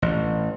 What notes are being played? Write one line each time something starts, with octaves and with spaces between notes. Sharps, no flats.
A1